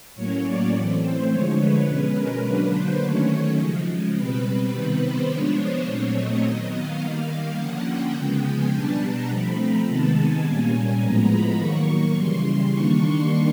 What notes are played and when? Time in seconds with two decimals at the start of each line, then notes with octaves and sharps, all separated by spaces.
0.14 A2 F#3 A#3 C#4 C#5
0.44 D5
0.72 E3 A3 C4
1.01 C5
1.29 D3 F3 G#3 C#5
1.58 B4
1.86 B2 G#3 C#4
2.15 A#4
2.43 D3 F#3 A#3 D4 B4
2.72 C5
3.01 D#3 F#3 A3 C#4 C#5
3.29 C#5
3.58 C#3 F3 G#3
4.15 B2 G3 C4 B4
4.73 C3 D#3 G3 B3
5.01 C5
5.29 F3 G#3 B3 D4 C#5
5.58 C5
5.86 A#2 F#3 A3 C4 C#5
6.15 D#5
6.43 D#3 F#3 B3 D#5
6.72 F5
7.00 D#3 G3 A#3
7.57 D3 F3 A#3 C#4 F#5
7.87 G5
8.14 C#3 F3 G#3 B3 G5
8.44 G#5
8.72 B2 G3 B3 D4 A5
9.01 A#5
9.29 F3 A3 C4 B5
9.58 A#5
9.86 C3 D#3 G#3 B3 A5
10.15 G#5
10.44 A#2 G3 A#3 C#4
11.00 A2 F3 G#3 B3 A#5
11.29 B5
11.57 D#3 F#3 A#3 C#6
11.86 C#6
12.14 C#3 E3 G3 C6
12.71 D#3 G3 A#3 D4 C#6
13.01 C6